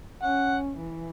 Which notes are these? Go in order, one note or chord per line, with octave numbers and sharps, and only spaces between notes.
C#4 F#5
E3